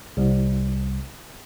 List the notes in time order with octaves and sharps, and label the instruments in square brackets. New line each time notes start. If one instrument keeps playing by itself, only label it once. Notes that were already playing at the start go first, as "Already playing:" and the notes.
[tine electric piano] C2